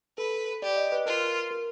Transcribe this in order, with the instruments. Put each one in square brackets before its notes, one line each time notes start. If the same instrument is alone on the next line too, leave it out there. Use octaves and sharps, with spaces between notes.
[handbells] A4 [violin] B4
[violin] G4 [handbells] D5
[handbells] D#5
B4
[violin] F4 [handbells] A#4
[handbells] A#4